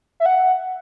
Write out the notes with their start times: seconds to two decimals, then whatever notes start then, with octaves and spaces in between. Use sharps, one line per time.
0.20 E5
0.26 F#5